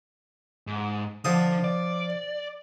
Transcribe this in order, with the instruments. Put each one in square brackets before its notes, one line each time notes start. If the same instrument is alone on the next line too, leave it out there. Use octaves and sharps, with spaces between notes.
[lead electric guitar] G#2
[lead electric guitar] D3 [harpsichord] F3 D#6
[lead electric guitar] D5